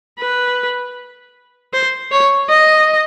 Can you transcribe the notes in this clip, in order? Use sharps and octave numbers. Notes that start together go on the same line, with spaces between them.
B4
C5
C#5
D#5